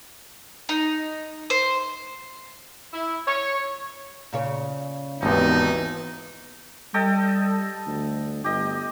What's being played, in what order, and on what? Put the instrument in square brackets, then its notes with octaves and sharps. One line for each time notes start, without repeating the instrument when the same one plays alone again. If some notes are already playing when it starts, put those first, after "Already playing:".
[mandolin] D#4
C5
[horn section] E4
C#5
[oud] A#2 C#3 C#5
[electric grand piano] G#1 D#2 [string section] E3 B3 [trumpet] D#4
[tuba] G3 [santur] A4 D#5 G5
[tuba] D2
[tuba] G1 [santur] G4 D#5